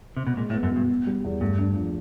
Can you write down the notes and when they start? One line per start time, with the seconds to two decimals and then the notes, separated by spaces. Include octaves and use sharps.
0.17 C3
0.27 B2
0.37 A#2 G#3
0.50 A2
0.54 B3
0.63 F#2
0.72 G2 B2
0.90 B2
1.07 G3
1.24 E2
1.41 G2 A3
1.58 D4
1.77 F3